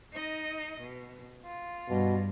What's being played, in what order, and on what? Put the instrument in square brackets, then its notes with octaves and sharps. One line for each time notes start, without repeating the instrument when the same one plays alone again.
[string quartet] D#4 D#5
B2
F4
[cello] G2 [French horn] B2